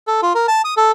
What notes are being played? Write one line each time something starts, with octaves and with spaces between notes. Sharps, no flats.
A4
F4
A#4
A5
D#6
A4